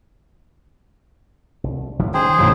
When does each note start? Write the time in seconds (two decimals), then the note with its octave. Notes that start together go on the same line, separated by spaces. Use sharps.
1.64 C2
1.99 D3
2.14 D#3 C#4 G#4 C5 G5
2.38 E1 A1 D#2